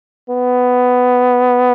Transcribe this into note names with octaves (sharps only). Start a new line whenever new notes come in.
B3